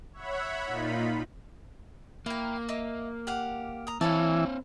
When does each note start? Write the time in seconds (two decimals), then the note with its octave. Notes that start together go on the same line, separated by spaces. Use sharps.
0.13 C#5 E5 F#5 B5
0.66 A#2 D#4 F4 B5
2.26 A#3 E4 G5
2.68 D#5 E5 D6
3.27 G4 F5 F#5
3.87 A#5 D#6
4.01 E3 C4 E4 C#5 F5 A5